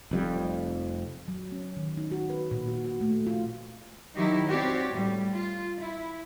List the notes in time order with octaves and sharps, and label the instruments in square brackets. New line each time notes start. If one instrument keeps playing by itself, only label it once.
[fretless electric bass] F1 F2 G3
[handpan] F#3
C#4
D#3
D#4
F#4
B4
A#2
F#4
F#4
A3
F4
[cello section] D#3 F#3 D#4 E4 G4
C4 F#4 G4 C#5 D5
A2 G3
F4
E4